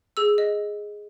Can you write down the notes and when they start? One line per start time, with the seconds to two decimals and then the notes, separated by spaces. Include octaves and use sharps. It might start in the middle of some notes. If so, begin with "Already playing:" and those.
0.17 G#4 E6
0.38 D#5